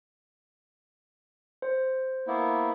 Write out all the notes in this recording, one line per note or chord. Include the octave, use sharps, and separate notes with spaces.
C5
A#3 B3 E4